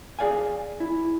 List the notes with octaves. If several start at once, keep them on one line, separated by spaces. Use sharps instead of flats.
G#4 B4 D5 F5 G#5
E4